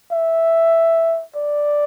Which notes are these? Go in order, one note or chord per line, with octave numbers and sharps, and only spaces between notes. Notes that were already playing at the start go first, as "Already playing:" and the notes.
E5
D5